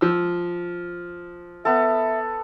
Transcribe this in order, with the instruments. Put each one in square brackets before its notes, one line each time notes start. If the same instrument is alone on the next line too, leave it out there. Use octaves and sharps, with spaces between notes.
[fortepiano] F3 E6
[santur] B3 A4 [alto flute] E5